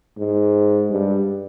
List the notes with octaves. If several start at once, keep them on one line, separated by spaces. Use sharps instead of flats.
G#2
G2